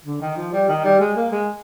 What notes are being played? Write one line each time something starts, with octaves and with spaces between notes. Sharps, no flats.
D3
D#3
F3
G3
D#3
G3
G#3
A#3
G#3